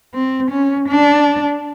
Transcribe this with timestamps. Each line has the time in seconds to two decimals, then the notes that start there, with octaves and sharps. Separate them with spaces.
0.14 C4
0.51 C#4
0.88 D4